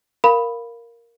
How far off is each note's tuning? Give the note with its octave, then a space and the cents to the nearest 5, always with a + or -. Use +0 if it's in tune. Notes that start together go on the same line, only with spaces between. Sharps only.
A#4 +0 F5 +0 B5 +0